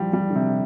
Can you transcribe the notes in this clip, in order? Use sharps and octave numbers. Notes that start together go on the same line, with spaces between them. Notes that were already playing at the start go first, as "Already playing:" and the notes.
Already playing: F3 G3
G3
D3
C3